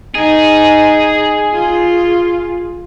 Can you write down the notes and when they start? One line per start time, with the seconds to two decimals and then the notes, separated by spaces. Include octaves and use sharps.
0.15 D#4 G#4
1.53 F4